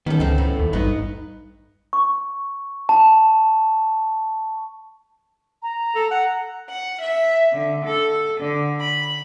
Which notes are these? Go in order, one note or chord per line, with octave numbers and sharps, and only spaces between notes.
D#3 B3 C#4 G4 A4
C#2 C4 D#4
A2
D#2
A1 G2 B3 D#4
C#6
A5
A#5
A4
F#5
F#5
E5
D3
A4
D3
B5